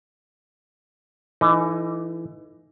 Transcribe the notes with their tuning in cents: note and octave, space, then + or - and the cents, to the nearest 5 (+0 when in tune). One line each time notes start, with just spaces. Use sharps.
E3 +20 A3 +0 D#4 +0